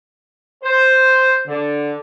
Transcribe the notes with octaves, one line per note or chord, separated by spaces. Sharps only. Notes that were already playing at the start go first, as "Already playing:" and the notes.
C5
D3